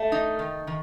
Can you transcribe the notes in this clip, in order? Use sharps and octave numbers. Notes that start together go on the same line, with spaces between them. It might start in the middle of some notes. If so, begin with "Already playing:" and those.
Already playing: A3 A5
D#4
D#3
D#3